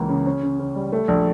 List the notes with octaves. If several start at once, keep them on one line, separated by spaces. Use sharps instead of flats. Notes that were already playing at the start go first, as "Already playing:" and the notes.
Already playing: C#2 E3 A#3
C#3
C#4
C#3
C#3
G3
A3
A#1